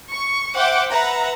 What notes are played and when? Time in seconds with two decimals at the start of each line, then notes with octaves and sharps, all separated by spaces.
0.13 C#6
0.55 C5 E5 F#5 G5 D6
0.91 B4 E5 F#5 A#5